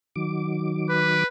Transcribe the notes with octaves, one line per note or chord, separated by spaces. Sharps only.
D#3 F#3 D6
B4